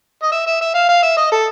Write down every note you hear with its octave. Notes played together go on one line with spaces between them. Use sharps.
D#5
E5
E5
E5
F5
F5
E5
D#5
A4